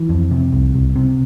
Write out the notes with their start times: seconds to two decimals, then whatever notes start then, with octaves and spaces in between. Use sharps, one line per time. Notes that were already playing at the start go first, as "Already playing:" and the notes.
Already playing: E3
0.09 F2
0.31 C3
0.53 C2
0.74 C2
0.96 C3